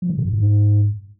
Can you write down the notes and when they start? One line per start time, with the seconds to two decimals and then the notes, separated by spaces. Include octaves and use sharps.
0.02 F3
0.10 D#3
0.17 A#2
0.25 G2
0.33 G#2